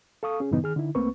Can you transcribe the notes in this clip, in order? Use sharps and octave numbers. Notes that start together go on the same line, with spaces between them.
A4 F5 C#6 D#6
C#4 G#4
G2 A#2 C#3 E3 B3 D#4
D#3 G#4 F6
D3 D#4 E4
C2 A3 A#3 C4 B4 C#6